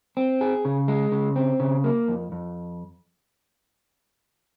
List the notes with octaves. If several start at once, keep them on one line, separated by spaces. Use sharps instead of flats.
C4
G#4
C#3
G#3
C#3
C4
C#3
A#3
F2
F2